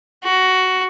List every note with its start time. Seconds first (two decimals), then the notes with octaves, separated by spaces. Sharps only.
0.24 F#4